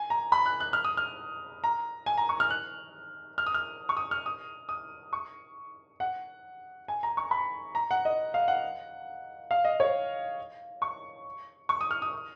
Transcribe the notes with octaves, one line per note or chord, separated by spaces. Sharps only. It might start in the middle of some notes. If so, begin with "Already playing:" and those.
Already playing: G#5
A#5
B5
F#6
F#6
F6
D#6
F6
A#5
G#5
A#5
C#6
F6
F#6
F6
D#6
F6
C#6
D#6
F6
D#6
D#6
C#6
F#5
G#5
A#5
C#6
B5
A#5
F#5
D#5
F5
F#5
F5
D#5
C#5
C#6
C#6
D#6
F6
D#6
D#6